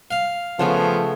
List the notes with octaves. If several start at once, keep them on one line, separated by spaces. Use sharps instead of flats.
F5
C#3 F3 A3 B3 C#4